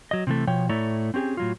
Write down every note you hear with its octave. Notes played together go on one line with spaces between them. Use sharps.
F#3 D#5
C3 E3 A3
B2 F3 C#5 G5
A2 A3 E4 C#5 D5 A#5
C4 C#4 G4 G#4
A2 F#3 F4